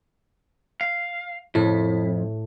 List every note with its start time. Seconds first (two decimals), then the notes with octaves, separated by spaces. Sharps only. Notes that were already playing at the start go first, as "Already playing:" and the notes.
0.81 F5
1.55 F2 A2 E4